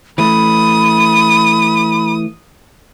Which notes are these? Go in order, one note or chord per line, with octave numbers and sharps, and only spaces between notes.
E3 A3 B5 D#6